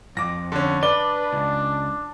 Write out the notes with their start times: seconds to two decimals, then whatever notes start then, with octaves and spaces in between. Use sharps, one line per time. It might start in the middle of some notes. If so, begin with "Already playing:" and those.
0.17 F2 D6 A#6
0.52 D3 C#4
0.83 D4 B4 D5 G7
1.33 C#2